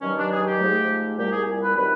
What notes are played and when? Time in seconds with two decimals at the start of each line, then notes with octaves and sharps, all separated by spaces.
0.01 G2 D#3 F#3 C#4
0.16 D4
0.31 G#4
0.46 G4
0.60 G#2 F3 A3
1.18 C2 A#2 G3 G4
1.32 G#4
1.62 B4
1.76 C3 D#3 F#3 B4